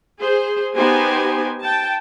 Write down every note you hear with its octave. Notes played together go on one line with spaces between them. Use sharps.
G#4 C5
B3 D#4 G4 C5 G#5
G5 A5